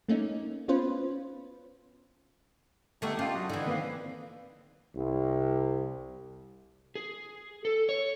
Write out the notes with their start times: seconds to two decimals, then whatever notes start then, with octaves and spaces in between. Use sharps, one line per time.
0.09 A3 A#3 C#4 D#4
0.68 B3 C#4 F4 B4 C5
3.02 D3 A3 B3 D4 D#4 G4
3.19 C#4 F4 G4 D#5 F5 G5 A5
3.35 F#3 D#5 F#5 D#6
3.50 D3 E3 D#4
3.66 D#3 A#3 C4 B4 F5
4.95 C2
6.95 G#4
7.65 A4
7.89 C#5